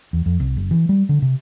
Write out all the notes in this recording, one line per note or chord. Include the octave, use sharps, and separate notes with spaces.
E2
F2
C2
F#1
E3
G3
D3
C3